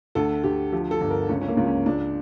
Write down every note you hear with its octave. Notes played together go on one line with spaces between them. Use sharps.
D2 A4
D2 G4
F3 G4
A4
G1
A#4
C#2 C#4
C#4
A#3
C#2
C#4
C#2 D4